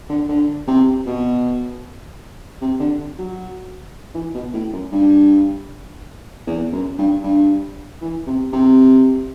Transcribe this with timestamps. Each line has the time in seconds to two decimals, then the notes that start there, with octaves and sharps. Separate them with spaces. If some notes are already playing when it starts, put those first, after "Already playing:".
0.09 D3
0.29 D3
0.68 C3
1.06 B2
2.61 C3
2.80 D3
3.19 F#3
4.14 E3
4.34 B2
4.54 A2
4.72 F#2
4.92 G2
6.47 E2
6.72 F#2
6.98 G2
7.23 G2
8.01 E3
8.27 C3
8.53 C3